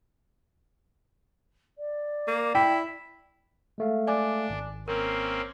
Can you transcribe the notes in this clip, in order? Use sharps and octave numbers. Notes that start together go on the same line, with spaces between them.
D5
A#3
E4 G5
G#3 A3 F5
D4 D5 G#5 D6
G#1
A#3 C4 C#4 A#4